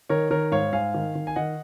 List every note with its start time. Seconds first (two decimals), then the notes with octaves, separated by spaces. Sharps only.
0.09 D#3 A#4 C#5
0.30 D#3 A#4 C#5
0.52 G#2 C#5 F5
0.72 G#2 F5 G#5
0.94 D#3
1.15 D#3
1.27 G#5
1.36 D#3 D#5 F#5